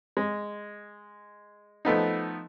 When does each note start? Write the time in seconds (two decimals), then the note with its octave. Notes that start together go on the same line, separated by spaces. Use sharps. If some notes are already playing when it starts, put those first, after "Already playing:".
0.17 G#3
1.85 F3 A3 B3 D#4